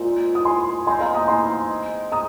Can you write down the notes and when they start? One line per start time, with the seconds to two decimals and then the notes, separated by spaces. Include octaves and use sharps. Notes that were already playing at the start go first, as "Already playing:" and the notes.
Already playing: A#2 G#3 C4 D#4
0.35 D#6
0.45 G#5 C6
0.86 G#3 C4 D#4 G#5 C6
1.00 F5 A#5
1.14 A#5 D#6
1.28 G#5 C6
2.12 A#5 D#6